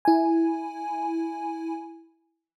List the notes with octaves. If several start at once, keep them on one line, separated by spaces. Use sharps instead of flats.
E4 G#5